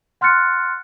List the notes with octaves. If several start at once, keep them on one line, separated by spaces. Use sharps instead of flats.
F#5 C6 F6 F#6 A6 C#7